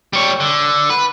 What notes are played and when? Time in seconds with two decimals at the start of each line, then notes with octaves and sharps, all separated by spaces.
0.13 G3 C#5
0.40 D3
0.90 B4